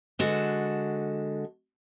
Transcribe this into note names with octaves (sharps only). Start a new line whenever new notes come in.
D3 G#3 F#4 A4